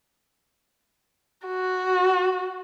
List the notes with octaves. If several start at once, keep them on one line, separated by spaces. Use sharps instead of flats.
F#4